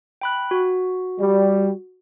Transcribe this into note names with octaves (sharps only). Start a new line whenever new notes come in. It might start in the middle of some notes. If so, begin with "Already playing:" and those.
G5 B5 F#6
F#4
G3